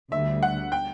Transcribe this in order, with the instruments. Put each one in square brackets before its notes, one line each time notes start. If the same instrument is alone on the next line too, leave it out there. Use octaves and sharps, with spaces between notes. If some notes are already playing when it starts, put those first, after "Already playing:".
[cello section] D2 D3 G3 [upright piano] E5
[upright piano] F#5
G5